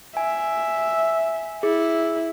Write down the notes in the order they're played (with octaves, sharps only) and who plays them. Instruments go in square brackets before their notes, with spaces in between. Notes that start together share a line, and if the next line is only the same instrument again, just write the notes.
[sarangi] E5 [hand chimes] G#5
[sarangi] E4 [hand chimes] G#4